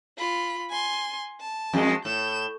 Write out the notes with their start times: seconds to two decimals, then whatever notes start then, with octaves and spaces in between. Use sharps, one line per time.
0.18 F4 B5
0.70 G#5 C6
1.41 A5
1.73 F2 G#3
2.05 A2 G6 E7